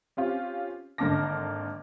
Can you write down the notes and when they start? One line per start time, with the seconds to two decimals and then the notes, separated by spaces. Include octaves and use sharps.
0.17 C4 C#4 F4 G4
0.98 G#1 D3 A#3 A5 D6 A#6